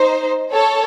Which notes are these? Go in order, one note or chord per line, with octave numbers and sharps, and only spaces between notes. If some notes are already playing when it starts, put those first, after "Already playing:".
Already playing: D#4 C5
A4 C#5